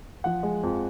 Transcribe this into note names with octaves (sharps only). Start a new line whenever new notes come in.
F3 F#5
G#3
F2